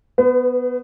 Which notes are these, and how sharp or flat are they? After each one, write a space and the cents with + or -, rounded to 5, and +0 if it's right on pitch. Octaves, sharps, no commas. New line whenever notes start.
B3 +0 B4 +35